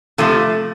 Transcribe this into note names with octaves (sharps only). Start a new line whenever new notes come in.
C3 F3 A3